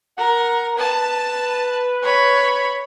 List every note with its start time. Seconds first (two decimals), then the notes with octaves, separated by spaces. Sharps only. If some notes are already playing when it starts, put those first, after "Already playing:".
0.17 A#4 F#5
0.78 B4 A5
2.02 C#5 B5